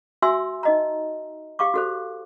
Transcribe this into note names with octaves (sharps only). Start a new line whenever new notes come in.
F#4 E5 G#5 C6 E6
D#4 D#5 A#5
G4 F5 C#6 D6
F#4 A4 C5